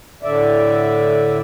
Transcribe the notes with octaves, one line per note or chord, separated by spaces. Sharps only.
A2 D3 D5 E5